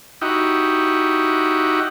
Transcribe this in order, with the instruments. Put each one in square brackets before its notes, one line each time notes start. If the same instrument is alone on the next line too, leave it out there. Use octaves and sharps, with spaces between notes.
[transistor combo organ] D#4 E4 F#4 G4